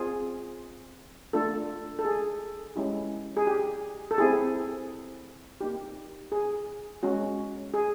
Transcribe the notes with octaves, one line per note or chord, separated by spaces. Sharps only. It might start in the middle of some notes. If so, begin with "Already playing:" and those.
Already playing: C4 F4 G#4
A3 D4 F4 A4
A4
G#4
G#3 C#4 E4 G4
G#4
G4
A4
C4 E4 G4 G#4
A#3 D#4 G4
G#4
G#3 C#4 F#4
G#4